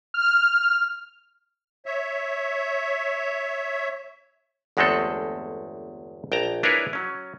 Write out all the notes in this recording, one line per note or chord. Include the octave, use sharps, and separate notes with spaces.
F6
C#5 E5
G1 E2 G#3 A3 C4 A4
A#1 G5 A5 A#5
D4 E4 G#4 A#4 B4 C#5
F#3 C#4